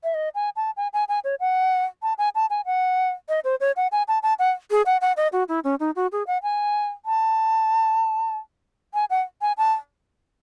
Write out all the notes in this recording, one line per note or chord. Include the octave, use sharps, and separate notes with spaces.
E5
D#5
G#5
A5
G#5
G#5
G#5
C#5
F#5
A5
G#5
A5
G#5
F#5
D#5
C5
C#5
F#5
G#5
A5
A5
F#5
G#4
F#5
F#5
D#5
F#4
E4
C#4
D#4
F#4
G#4
F#5
G#5
A5
G#5
F#5
G#5
A5